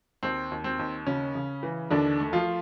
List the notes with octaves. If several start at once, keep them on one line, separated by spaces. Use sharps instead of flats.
D#2 C4
D#2
C4
D#2
C#3 C#4
C#3
E3
D#2 D3 D4
A3
F3 F4